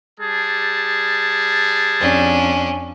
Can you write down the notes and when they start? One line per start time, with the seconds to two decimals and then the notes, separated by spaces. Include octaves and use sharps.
0.20 G3 G#4 A5
2.00 F2 C#4 D4